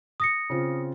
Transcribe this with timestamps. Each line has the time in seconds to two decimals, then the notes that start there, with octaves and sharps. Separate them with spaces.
0.20 D#6 A#6 C#7
0.50 C#3 C4 F4